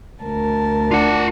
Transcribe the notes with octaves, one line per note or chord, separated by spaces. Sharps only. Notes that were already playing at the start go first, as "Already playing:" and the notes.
D2 A#4 A5
D4 F4 F#5